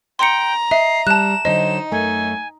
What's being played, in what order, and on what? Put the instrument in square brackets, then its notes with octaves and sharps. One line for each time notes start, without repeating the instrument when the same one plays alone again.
[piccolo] G5 [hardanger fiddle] A#5 [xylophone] C6 C#7
[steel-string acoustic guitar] D#5 [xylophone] E5 [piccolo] C7
[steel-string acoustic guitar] G3 [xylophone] A5 F#6 [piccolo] E7
[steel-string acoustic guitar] D3 F#3 C5 [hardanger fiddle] D#4 [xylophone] D#5
[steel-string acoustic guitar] F#2 A3 [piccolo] G#5